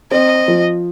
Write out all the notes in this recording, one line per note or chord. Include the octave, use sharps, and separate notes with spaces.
C4 D#5
F3